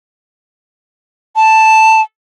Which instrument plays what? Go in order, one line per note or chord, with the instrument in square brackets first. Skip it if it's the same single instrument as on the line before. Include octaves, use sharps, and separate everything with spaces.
[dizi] A5